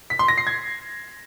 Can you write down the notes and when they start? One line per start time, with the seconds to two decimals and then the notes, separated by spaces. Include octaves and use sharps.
0.10 B6
0.19 C6
0.28 A#6
0.38 C7
0.47 G#6